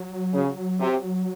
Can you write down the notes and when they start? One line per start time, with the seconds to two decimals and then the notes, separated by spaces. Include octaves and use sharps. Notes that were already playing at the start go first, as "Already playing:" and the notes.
Already playing: F#3
0.33 C#3
0.80 C3